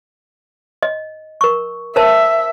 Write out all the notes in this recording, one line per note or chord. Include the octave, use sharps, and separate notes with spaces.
D#5
A#4 C#6
A#4 C5 E5 A5